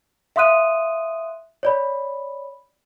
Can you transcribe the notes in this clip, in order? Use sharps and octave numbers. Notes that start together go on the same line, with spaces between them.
E5 F5 C6 D#6 F#6 D#7
C#5 D5 B5